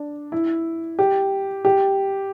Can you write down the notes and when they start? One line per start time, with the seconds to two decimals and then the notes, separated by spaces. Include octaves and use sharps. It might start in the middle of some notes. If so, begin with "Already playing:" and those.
Already playing: D4
0.32 E4
0.99 G4
1.65 G4